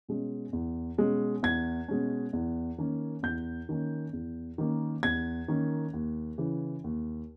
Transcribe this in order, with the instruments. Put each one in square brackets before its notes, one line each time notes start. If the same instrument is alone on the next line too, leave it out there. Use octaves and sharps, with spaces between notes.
[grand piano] B2 G#3 C#4
E2
B2 G#3 C#4
E2 G#6
B2 G#3 C#4
E2
D#3 A#3 C#4
E2 G6
D#3 A#3 C#4
E2
D#3 A#3 C#4
E2 G#6
D#3 A#3 C#4
D#2
C#3 E3
D#2